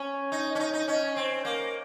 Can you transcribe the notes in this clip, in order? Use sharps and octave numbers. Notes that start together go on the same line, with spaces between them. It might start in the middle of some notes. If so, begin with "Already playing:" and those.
Already playing: C#4
D#4
C#4
D#4
D#4
C#4
C4
A#3